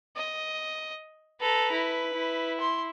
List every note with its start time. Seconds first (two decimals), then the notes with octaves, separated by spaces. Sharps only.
0.16 D#5
1.41 A4 B4 A#5
1.72 E4
2.13 E4
2.60 C6